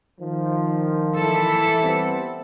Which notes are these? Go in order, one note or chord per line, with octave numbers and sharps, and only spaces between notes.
D#3 F3
E3 E4 A4
G3 B3 C4